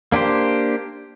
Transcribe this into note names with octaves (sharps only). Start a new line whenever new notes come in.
A#3 D4 G4 C5